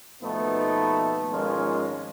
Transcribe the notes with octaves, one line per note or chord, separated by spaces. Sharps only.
D#2 B2 F3 A3 B3 D#4
G#1 F3 G#3 C#4 F4 A#4